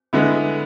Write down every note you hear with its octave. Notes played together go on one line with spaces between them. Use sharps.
D3 G#3 B3 E4